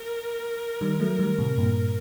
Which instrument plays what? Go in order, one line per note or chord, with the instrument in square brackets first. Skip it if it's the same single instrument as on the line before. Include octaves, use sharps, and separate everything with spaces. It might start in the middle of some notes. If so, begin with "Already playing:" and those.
Already playing: [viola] A#4
[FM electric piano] D#3 G3
F#3 A3
D#3 G3
A2 C3
G2 A#2